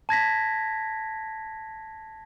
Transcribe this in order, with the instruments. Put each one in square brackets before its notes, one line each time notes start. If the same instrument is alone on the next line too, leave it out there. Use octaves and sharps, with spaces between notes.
[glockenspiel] A5 G#6 A#6 B6